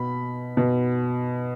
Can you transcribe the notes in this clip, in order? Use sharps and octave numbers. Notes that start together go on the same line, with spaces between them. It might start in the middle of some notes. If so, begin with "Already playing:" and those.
Already playing: B2 B5
B2